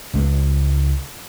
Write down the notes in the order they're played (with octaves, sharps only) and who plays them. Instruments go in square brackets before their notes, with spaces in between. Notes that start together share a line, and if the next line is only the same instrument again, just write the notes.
[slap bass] C#2 G#3